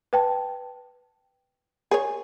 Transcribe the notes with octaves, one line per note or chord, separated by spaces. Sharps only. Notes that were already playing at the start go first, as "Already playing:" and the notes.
B4 G5 A5
G#4 A#4 C#5